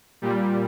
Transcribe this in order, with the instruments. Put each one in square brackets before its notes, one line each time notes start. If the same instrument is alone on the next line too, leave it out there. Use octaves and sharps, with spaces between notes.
[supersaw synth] A#2 G3